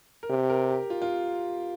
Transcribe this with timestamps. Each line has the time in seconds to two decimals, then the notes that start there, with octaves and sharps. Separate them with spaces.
0.23 A#4
0.29 C3 G4
0.50 A#4
0.70 G4
0.90 F4
1.02 F4